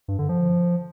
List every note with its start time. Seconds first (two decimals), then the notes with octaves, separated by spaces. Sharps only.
0.08 G2
0.19 D3
0.29 F3